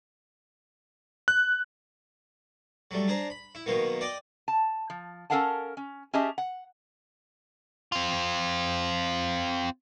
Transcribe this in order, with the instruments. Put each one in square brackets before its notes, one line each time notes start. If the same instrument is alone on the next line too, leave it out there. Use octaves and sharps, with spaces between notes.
[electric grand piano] F#6
[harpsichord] F#3 G3 A3
D4 G#4 C5 A#5
B5
E4
B2 D#3 F#3 A#3 B3
D5 D#5 G5 D6
[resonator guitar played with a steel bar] A5
F3
C#4 A4 A#4 F5 F#5 A5
C#4
C#4 G4 G#4 D#5 E5 A5
F#5
[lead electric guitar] C4 F4